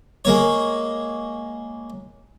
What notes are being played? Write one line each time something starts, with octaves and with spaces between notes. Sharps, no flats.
G#3 A#3 C#5